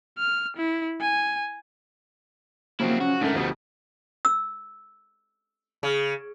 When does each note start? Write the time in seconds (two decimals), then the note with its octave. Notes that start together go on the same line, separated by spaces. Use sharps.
0.18 F6
0.56 E4
1.01 G#5
2.80 C#3 F3 F#3 A#3 C4 E4
3.01 C#4 F#4
3.21 G#2 D3 A3 A#4
3.35 D2 B2 F3 A3 G4
4.25 E6
5.83 C#3